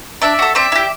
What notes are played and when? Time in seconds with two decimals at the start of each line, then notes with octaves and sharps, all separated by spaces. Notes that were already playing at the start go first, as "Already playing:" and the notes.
0.22 D4 D5 E5
0.39 F#4 A4
0.55 C4 D5 E5
0.72 E4 G4